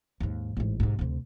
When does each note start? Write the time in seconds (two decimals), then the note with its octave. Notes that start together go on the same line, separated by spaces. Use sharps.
0.20 D#2 G#2
0.57 A1 G#2
0.80 G#2 C3
0.99 D2 C3